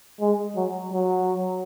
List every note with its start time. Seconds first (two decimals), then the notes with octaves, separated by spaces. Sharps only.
0.21 G#3
0.56 F#3
0.92 F#3